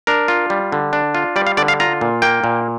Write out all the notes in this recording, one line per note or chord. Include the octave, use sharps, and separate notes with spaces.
D4 A#4
F4
G3
D3
D4
F4
G3 D5
F5
D3 D5
F5
F4 A#5
A#2
A#3 G5
A#2